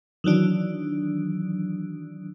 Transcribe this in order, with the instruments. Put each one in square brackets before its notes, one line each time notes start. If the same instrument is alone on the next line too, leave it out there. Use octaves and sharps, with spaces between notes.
[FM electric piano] D#3 E3 F#3 D4